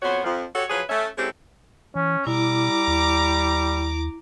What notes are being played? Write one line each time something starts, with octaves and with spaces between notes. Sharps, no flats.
F2 B3 F#4 C5 C#5
F2 F3
F#4 G4 A4 C#5
F3 F#3 G#4 B4 C#5
A3 C#4 E5
G#3 C4 C#4 E4 G4 A4
E3 C#4
B2 G3 E4 A#5 D6
D#2